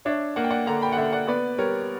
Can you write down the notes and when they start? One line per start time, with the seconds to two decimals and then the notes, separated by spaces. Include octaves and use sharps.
0.05 D4 C#5 E5
0.36 A#3 F#5
0.44 G5
0.50 D5 F#5
0.66 D3 F#5 A#5
0.82 G5 B5
0.92 F#5
0.97 D3 E5 G5
1.13 D5 F#5
1.27 B3 B4 D5
1.58 G3 A#4 C#5